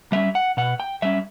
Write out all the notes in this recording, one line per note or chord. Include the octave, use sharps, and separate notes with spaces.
G3 C#4 E5
F#5
B2 F#5
G5
G3 C#4 E5